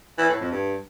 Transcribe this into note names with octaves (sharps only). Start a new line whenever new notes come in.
E3
A2
F2
G2